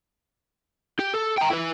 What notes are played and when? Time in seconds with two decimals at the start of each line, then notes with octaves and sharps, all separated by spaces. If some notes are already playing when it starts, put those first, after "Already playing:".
0.99 G4
1.14 A4
1.38 G5 A#5
1.51 E4 B4